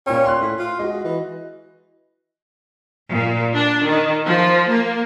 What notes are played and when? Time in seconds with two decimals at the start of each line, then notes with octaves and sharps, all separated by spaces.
0.06 A#2 C#4 G5
0.26 C6 F#6
0.40 A2
0.59 F4
0.79 G#3 F#4 D#5
1.04 E3
3.10 A#2
3.55 D4
3.86 D#3
4.25 F3
4.70 A#3